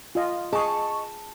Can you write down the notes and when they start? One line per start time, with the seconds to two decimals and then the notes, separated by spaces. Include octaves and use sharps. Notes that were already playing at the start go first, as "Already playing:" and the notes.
0.15 F4 D#5
0.53 G#4 D#5 A5 C#6